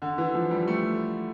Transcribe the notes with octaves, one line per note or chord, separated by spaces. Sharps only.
D3
E3
F3
G3
A3